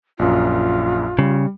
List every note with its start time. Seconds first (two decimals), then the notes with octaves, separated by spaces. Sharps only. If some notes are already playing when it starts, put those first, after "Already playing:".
0.19 A#1 F#2 F4
1.19 C#3 G3